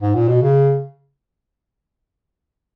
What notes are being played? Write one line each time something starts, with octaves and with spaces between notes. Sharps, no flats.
G#2
A#2
B2
C#3